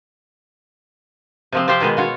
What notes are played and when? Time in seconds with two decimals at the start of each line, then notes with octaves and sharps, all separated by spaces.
1.52 C3 F3 C4
1.68 C4 F4 G4 C5 G5
1.80 B2 D#3 G#3 B3
1.97 F4 F#4 C#5